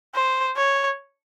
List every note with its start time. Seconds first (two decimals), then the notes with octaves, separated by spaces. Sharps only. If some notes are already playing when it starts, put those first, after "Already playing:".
0.15 C5
0.56 C#5